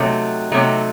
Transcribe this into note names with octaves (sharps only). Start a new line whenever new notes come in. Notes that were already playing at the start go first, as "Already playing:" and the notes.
Already playing: C3 F#3 A3 D#4
C3 F#3 A3 D#4